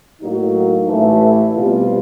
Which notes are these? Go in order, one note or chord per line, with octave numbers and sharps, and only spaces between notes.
A2 F#3 A#3 D#4
A1 A2 E3 A3
B2 G3 C4 F4